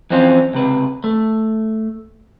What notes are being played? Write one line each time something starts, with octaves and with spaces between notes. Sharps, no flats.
F2 E3 C4 C#4 F4
C#2 C3 B4
A3